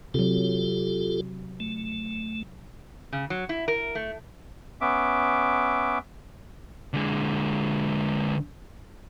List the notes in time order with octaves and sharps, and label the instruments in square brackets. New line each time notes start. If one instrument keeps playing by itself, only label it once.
[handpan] C3 F#3 [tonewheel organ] F4 G4 A4
[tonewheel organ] A3
[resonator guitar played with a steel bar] C#3
F#3
E4
A#4
A3
[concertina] B3 C#4 E5 D6
[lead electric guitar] D3 G#3